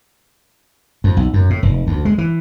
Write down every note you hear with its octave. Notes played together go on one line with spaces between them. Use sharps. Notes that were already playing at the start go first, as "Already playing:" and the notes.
F2
B1
F#2
A2
F1
D2
G#3
E3